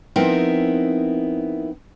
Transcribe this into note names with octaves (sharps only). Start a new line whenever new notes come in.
F3 B3 C4 D#4 E4 A#4